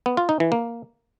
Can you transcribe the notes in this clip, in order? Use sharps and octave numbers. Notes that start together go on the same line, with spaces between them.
B3
F4
D#4
E3
A#3